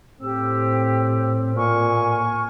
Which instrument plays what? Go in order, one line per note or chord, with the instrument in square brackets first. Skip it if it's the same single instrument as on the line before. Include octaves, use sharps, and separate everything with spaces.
[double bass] A2 [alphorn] C4 [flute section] G4 E6
[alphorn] A#2 [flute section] G#5 C#6 F6